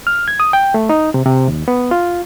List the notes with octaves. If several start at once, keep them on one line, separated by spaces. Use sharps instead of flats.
F6
G#6
D#6
G5
A3
D#4
C3
C3
D#2
B3
F4